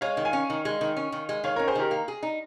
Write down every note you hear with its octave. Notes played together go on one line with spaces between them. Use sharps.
G#3 C#5 F5
D#3
F5 G#5
C#4
D#3
G#3
D#3
C#4
D#3
G#3
D#3 C#5 F5
C#4 A#4 C#5
G#4 C5
D#3 G4 A#4
A#3
G#4
D#4